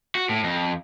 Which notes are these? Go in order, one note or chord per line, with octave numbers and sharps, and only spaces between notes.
F#4
A2
F2